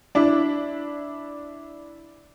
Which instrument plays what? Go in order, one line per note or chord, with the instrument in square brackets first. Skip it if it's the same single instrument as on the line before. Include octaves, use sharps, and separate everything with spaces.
[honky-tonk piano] D4 E4